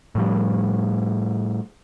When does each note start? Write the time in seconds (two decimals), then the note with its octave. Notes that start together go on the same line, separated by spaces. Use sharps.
0.15 A2 F3 G3